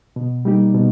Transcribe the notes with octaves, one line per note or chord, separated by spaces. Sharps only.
B2
G3 A#3 D#4 G4
B2